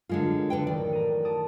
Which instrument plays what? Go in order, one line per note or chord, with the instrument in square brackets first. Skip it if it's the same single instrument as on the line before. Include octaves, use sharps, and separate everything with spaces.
[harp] F#2 [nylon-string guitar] D3 G#3 F4
[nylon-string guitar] D3 B4 G5
[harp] A1 D#3 [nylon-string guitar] D5
[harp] A#5 D#7
D5 A5 D#6